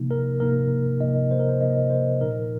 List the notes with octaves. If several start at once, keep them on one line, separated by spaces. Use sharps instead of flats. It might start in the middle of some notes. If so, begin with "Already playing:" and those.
Already playing: C3 F3 A#3 D#4
A#4
C3 F3 A#3 D#4 A#4
C3 F3 A#3 D#4 D#5
C5
A#4
C5
C3 F3 A#3 D#4 D#5
C5
A#2 F3 D#4 A#4